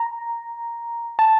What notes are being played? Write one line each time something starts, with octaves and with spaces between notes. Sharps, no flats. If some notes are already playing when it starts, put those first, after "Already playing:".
Already playing: A#5
A5